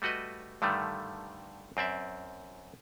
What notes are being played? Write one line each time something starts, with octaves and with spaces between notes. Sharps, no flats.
G3 A3 F#4 B4 D#5
G2 D3 D#3 G3 A3
F#2 C4 D5 E5